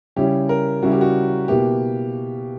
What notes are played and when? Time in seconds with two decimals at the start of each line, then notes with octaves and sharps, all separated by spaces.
0.16 C#3 G3 C#4 E4 G4
0.49 A#4
0.82 C#3 G3 C#4 E4 F#4
0.92 G4
1.01 F#4
1.48 B2 A#3 E4 G4